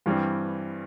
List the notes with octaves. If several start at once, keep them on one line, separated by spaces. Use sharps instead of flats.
G2 E3 G3 C4